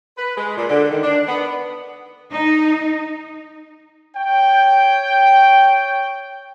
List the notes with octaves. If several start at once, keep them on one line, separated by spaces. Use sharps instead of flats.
B4
G#3
A#2
D3
D#3
D4
B3
D#4
C#5 G5